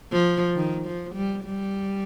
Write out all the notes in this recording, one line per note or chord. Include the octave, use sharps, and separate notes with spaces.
F3
D#3
F3
G3
G3